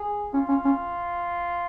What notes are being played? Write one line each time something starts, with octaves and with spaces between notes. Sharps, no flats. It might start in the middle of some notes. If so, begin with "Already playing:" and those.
Already playing: G#4
C#4 F4
C#4
C#4